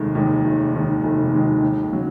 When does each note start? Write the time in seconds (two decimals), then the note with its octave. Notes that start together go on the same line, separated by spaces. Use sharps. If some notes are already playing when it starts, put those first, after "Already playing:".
Already playing: F1 D#2 D#3 G#3
0.15 D#2 D#3 G#3
0.45 F1
0.75 D#2 D#3 G#3
1.03 F1
1.33 D#2 D#3 G#3
1.62 D#2
1.92 C#3 F#3